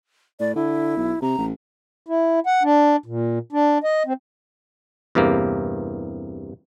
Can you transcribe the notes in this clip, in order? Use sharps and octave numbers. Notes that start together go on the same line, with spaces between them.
A2 D5
D3 E4
B1
C3 A#5
A1
E4
F#5
D4
A#2
D4
D#5
C4
E2 G2 C3 A#3